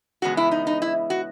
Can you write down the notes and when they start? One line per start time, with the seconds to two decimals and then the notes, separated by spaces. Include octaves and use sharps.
0.22 E2 C#3 G#3 B3 F#4
0.37 E4
0.51 D#4
0.67 D#4
0.82 E4
1.10 F#4